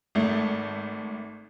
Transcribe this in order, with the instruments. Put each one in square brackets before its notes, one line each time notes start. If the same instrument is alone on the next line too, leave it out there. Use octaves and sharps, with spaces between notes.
[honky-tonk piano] G#1 A3